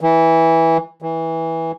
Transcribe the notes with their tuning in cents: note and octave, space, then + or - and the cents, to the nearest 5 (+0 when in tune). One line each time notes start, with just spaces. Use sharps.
E3 -10
E3 -15